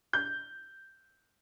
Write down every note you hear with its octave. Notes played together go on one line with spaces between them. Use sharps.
G6